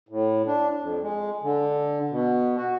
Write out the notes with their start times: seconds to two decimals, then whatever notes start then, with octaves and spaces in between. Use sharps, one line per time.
0.09 A2
0.46 D4
0.81 F2
1.02 G#3
1.43 D3
2.10 B2
2.57 F#4